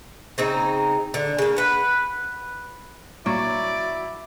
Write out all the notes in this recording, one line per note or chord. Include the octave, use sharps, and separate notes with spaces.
C#3 C4 D#4
D3
C#3 A#3
B4 F#5
G2 A#2 F#3 E4 D5